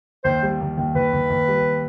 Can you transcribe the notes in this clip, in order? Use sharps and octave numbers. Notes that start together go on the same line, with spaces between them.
D#2 C5
G3
D#2
D#2
D#2 B4
D#2
D#2
G3